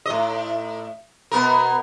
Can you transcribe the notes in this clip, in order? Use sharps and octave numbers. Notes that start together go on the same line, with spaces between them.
A2 D#5
B2 B3 A#4